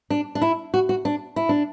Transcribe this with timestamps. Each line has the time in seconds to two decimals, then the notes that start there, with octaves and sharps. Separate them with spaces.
0.10 D4
0.35 D4
0.42 E4
0.74 F#4
0.89 F#4
1.05 D4
1.36 E4
1.49 D4